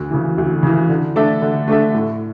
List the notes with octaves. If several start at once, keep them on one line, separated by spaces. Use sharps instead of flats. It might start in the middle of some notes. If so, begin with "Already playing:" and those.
Already playing: D2
C#3 E3
D2
C#3 E3
D3
A3 D4 A4 E5
D3
A3 D4 A4 E5
A2